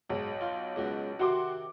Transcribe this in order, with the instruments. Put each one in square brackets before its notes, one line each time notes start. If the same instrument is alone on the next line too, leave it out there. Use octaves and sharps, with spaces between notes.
[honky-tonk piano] B1 [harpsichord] G#2
[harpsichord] F4
C#2 B2 F#4
[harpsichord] C3 D#3 [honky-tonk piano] F#4 C6 D6